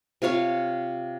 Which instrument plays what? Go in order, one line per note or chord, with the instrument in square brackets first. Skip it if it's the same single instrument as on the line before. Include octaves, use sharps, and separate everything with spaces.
[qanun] C3 F4 C#5 F5